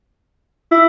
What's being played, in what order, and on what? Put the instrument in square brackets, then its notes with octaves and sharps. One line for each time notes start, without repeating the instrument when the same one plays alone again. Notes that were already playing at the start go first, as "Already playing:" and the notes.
[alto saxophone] E4